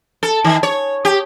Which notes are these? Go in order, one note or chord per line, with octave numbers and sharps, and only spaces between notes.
A4
D#3
C#5
G4